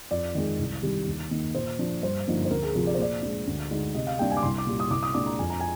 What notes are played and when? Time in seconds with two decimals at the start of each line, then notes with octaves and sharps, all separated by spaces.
0.11 F2 D5
0.35 D#3 G#3
0.59 C2
0.83 C3 D#3 G3
1.07 D#2
1.31 D#3 A#3
1.55 A#2 C5
1.79 F3 A#3 D4
2.03 G2 C5
2.27 D3 F3 A#3 D#4
2.45 C5
2.51 D2 A#4
2.63 G#4
2.75 C3 F3 A#4
2.87 D5
2.94 C5
2.98 A#2 D5
3.22 G#3 D4
3.47 D2
3.71 D3 G#3 D#4
3.95 C3 D#5
4.07 F5
4.19 G3 A#3 D4 G5
4.31 G#5
4.37 D6
4.43 C2 C6
4.58 D6
4.67 A#2 G3
4.80 D#6
4.90 C2 D6
5.03 D#6
5.14 A#2 G#3 D4 D6
5.26 A#5
5.39 F2 G#5
5.50 A#5
5.61 G#5